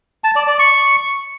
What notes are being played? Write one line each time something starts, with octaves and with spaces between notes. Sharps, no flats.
A5
D5
D5
C#6